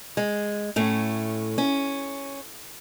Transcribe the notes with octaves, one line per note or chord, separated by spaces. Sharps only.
G#3
A2 A3 C#4
C#4